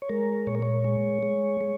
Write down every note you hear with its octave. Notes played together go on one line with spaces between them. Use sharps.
C#5
G#3 A#4
A#2 C#5
A#4
C#5
G#3
G#3
G#3